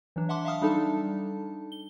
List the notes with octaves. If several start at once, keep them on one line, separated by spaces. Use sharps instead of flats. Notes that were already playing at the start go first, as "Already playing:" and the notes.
E3 F#3 D4
E5 F#5 A5 C6 D6
E5 F5 A5 D#6 F6
G3 D4 D#4 A4 A5
G7